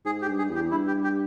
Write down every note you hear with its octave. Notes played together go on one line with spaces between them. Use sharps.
G#2 G#4
G4
G2
G#4
E2
G4
G2 E4
G4
G4